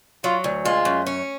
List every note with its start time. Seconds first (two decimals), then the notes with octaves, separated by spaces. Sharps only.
0.24 F#3 F4
0.44 D2
0.65 G#3 F4
0.85 F#2
1.06 C#4